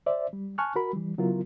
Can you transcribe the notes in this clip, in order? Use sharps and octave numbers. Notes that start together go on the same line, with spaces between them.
C5 D5 E5
G3
G#5 A5 C#6 F6 F#6
F#4 A#4 B5
E3 G3
C#3 F#3 B3 E4 F4 A#4